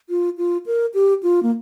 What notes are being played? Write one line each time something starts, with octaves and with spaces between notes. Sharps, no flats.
F4
F4
A#4
G4
F4
A#3